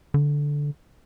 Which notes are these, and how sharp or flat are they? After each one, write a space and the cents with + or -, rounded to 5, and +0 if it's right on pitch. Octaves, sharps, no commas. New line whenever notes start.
D3 -10